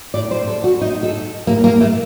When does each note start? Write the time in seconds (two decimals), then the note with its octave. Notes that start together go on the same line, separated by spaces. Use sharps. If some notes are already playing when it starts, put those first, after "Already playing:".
0.14 A2 D5
0.31 C5
0.47 A4
0.64 F#4
0.81 A2 D#4
1.03 A4
1.47 A2 A#3
1.64 A#3
1.81 A3